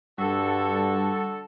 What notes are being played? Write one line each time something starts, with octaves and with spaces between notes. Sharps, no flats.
G2 D3 G3 F#4 A4